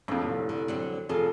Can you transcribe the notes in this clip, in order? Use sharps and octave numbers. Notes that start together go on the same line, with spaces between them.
A#1 F2 A2
F1
D3
D3 F#3 C4
F1 F4 G#4 A4